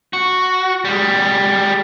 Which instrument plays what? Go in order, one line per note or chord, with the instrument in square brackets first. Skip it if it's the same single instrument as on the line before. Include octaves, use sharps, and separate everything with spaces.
[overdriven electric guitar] F#4
G3 G#3